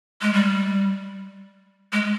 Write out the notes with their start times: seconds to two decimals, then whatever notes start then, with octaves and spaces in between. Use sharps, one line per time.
0.22 G#3
0.33 G3
1.92 G#3